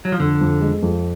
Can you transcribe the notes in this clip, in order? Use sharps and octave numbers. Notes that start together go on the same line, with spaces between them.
F#3
F3
F2 D3
F2
G#3
F2